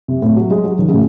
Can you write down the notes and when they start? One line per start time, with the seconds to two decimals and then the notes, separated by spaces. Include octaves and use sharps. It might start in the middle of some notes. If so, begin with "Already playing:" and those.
0.08 C3
0.22 A2
0.36 F#3
0.51 G#3
0.64 F#3
0.79 D#3
0.88 C#3
0.93 A2